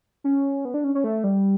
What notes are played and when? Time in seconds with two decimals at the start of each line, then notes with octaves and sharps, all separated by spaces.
0.24 C#4
0.65 B3
0.74 D4
0.84 C#4
0.95 C#4
1.04 A3
1.24 G3